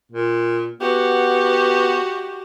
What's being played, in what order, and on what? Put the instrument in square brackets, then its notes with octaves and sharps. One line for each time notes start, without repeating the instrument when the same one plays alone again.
[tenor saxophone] A#2
[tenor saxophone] B3 [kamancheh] F#4 G4